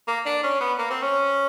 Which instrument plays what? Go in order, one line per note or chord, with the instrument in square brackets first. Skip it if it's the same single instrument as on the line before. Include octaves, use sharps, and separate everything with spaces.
[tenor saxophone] A#3
D4
C#4
B3
A#3
C4
C#4